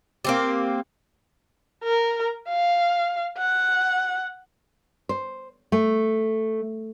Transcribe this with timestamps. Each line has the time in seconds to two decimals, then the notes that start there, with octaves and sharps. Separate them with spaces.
0.25 A#3 C4 G4
1.83 A#4
2.49 F5
3.38 F#5
5.09 C5
5.72 A3